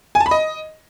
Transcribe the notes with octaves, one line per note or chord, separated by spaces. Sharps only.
G#5
A5
B5
D#5